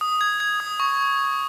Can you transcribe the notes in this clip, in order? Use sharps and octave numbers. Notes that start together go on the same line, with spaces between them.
D#6
G#6
G#6
D#6
C#6